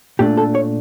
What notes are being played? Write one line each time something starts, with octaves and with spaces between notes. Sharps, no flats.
A#2 A3 D4 G4
A4
C#5